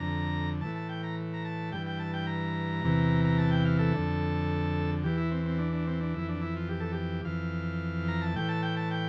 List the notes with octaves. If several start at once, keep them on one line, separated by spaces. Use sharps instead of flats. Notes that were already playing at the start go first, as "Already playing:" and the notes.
Already playing: F2 D3 A#5
A2 E3 A5
A5
G5
A#5
A#5
A5
G2 E3 G5
G5
A5
G5
A#5
E2 C3 E3
A#5
A5
G5
F5
A4
F2 D3
E2 E3 G4
E4
C4
C4
D4
D4
C4
D4
F2 E3 E4
D4
E4
F4
G4
A4
G4
F2 E3 F5
A#5
A5
A2 E3 G5
A5
G5
A5
G5